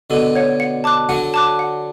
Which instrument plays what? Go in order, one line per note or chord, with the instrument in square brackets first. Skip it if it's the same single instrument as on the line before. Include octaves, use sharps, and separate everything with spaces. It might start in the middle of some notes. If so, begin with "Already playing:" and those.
[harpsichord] B2 D3 [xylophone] A4
[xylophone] C#5 F#5
F#5
A5 D6 F#6
[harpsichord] D3 F#3 [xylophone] F#5
[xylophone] A5 D6 F#6
F#5